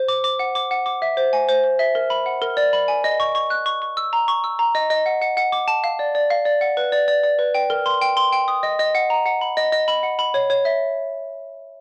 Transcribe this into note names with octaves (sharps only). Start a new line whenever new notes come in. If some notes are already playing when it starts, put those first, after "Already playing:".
Already playing: C5
D6
D6
F#5
D6
F#5
D6
E5
C5
G#5
C5
C5
E5
A#4
B5
F#5
A#4
D5
B5
G#5
D#5
C#6
C#6
F#6
C#6
C#6
E6
A#5
C#6
E6
A#5
D#5
D#5
F#5
F#5
F#5
D6
A5
F5
D5
D5
F5
D5
F#5
B4
D5
D5
D5
B4
G5
A#4
C6
G5
C6
G5
D#6
D#5
D#5
F#5
A#5
F#5
B5
D#5
D#5
B5
F#5
B5
C#5
C#5
E5